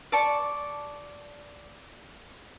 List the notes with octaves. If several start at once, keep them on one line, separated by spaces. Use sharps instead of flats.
D5 A5 C#6